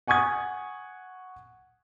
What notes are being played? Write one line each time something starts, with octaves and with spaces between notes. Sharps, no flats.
F#5 G#5 C#6 D#6 G#6